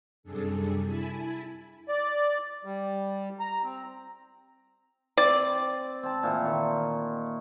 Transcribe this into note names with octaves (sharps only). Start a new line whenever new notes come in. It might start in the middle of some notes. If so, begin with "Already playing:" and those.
F#2 C3 G3 D4 G#4 A4
E4 G#5 A5 B5
D5
G3
A#5
C4
C4 D5
C4 A5
A#2 E3 C5
D#3 C#6